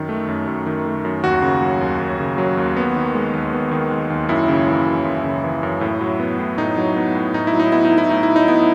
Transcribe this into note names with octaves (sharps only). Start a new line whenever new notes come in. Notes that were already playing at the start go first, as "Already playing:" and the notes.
Already playing: F#2 D#3
A3
F#2
F#2
D#3
A3
F#2
D#2 F#4
C#3
F#3
D#2
D#2
C#3
F#3
D#2
B3
D#3
G#3
D#2
B3
D#3
G#3
D#2
F#2 E4
C#3
E3
F#2
F#2
C#3
E3
F#2
A2
F#3
B3
A2
A2 D#4
F#3
B3
A2
A2 D#4
E4
F#3
D#4
B3 E4
D#4
A2
E4
A2 D#4
E4
F#3
D#4
B3 E4